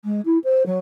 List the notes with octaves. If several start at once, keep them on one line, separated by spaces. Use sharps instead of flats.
G#3
E4
C5
F#3